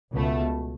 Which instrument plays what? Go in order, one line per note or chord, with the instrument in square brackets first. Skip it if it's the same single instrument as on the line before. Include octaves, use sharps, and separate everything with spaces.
[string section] C#2 B2 A3